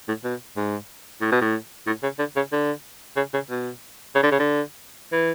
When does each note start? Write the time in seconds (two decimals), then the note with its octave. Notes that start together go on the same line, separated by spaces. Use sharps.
0.08 A2
0.24 B2
0.57 G#2
1.21 A2
1.32 B2
1.41 A2
1.87 A2
2.03 C#3
2.19 D3
2.36 C#3
2.52 D3
3.16 C#3
3.33 C#3
3.50 B2
4.15 C#3
4.23 D3
4.31 C#3
4.39 D3
5.12 E3